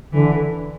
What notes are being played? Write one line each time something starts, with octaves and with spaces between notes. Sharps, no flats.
D3 E3